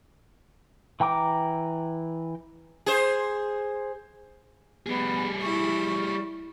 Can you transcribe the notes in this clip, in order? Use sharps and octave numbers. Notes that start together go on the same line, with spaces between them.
E3 G5 A#5 D6
G#4 C5
G3 B3 G#4
E4 C#6